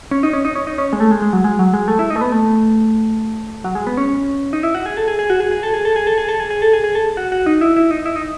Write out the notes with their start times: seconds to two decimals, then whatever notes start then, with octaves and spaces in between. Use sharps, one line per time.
0.11 C#4
0.23 D#4
0.33 C#4
0.45 D#4
0.55 C#4
0.67 D#4
0.78 C#4
0.93 G#3
1.00 A3
1.11 G#3
1.22 G#3
1.33 F#3
1.44 G#3
1.59 F#3
1.74 G#3
1.88 A3
1.99 E4
2.10 D#4
2.16 A3
2.21 B3
2.32 A3
3.64 F#3
3.75 G#3
3.87 B3
3.97 C#4
4.53 D#4
4.63 E4
4.75 F#4
4.86 G#4
4.97 A4
5.08 G#4
5.19 G#4
5.30 F#4
5.40 G#4
5.51 G#4
5.63 A4
5.74 G#4
5.85 A4
5.96 G#4
6.07 A4
6.18 G#4
6.29 A4
6.40 G#4
6.50 G#4
6.62 A4
6.73 G#4
6.84 G#4
6.95 A4
7.17 F#4
7.32 F#4
7.46 D#4
7.61 E4
7.76 E4
7.91 D#4
8.06 E4
8.16 D#4